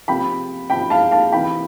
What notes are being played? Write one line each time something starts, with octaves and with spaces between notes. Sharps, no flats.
C3 F3 G5 B5
C3 F3 G5 B5
F5 A5
F5 A5
C3 E3 G5 B5